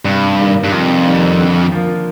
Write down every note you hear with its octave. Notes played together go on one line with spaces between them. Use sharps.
G2 C3
D#3 G3 A#3
G2
F2 C3
D#3 G3 A#3
D3
F3 A#3 F4